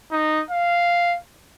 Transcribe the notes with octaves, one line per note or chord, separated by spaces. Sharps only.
D#4
F5